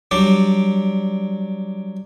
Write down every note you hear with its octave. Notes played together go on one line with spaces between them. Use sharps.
F#3 G3 D4 G4